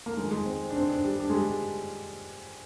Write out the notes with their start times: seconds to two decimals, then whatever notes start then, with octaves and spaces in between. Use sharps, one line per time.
0.06 A#3
0.17 F2 D#3 G#3
0.31 G#3
0.46 C4
0.70 D4
0.76 C4
0.90 D4
1.05 G3
1.20 D4
1.29 G#3
1.34 G3